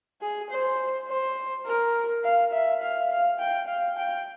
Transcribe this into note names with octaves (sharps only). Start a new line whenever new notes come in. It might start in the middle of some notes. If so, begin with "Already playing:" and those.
G#4
C5
C5
A#4
F5
E5
F5
F5
G5
F5
G5